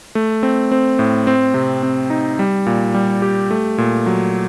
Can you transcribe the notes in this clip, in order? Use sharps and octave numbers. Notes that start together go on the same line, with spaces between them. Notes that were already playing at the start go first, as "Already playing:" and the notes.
A3
C4
C4
A2
C4
C3
C4
D#4
G3
A#2
G3
G4
A3
A#2
F#3